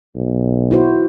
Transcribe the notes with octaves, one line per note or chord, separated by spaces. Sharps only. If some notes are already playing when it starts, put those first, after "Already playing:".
B1
E4 F#4 C5